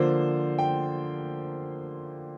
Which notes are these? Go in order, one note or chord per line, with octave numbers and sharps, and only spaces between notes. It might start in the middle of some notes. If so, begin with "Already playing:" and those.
Already playing: D3 F3 A#3 F4 C5
G5